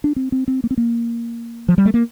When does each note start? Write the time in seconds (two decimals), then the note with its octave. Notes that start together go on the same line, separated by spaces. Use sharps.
0.04 D4
0.16 C4
0.32 C4
0.48 C4
0.64 A#3
0.71 C4
0.78 A#3
1.68 F3
1.78 G3
1.85 A3
1.94 A#3